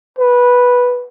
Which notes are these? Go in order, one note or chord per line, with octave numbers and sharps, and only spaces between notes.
B4